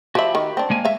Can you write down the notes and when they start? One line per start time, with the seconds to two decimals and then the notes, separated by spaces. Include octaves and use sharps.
0.15 F3 F#4 G4 E5 B5
0.35 D#3
0.57 C4 D4
0.70 G#3 A#3 G#5
0.85 E5 F5